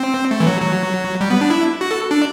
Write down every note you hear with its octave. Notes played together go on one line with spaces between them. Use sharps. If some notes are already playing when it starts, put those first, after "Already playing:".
Already playing: C4
A3
E3
F#3
F#3
G3
B3
D4
E4
F#4
A4
D4